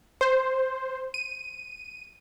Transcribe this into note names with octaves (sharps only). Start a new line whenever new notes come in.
C5
D#7